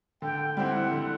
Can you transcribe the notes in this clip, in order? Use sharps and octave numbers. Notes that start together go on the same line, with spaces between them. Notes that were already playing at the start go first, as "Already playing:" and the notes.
D3 G5
G3 C4 E4 F#5
D3